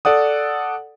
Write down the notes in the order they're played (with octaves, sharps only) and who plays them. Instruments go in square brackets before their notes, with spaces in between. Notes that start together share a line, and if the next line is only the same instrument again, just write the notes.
[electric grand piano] A4 D5 F#5 D#6